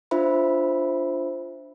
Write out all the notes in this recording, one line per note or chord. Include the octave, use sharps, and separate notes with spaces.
D4 F4 C5 E5 B5